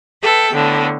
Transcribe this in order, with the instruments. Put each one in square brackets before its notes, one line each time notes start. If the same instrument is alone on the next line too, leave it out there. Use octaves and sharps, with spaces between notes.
[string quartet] A4 B4 E5 G5
A2 D3 B3